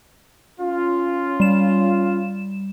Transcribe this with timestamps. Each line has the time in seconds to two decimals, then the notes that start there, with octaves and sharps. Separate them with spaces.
0.61 C#4 F4
1.40 G3 E7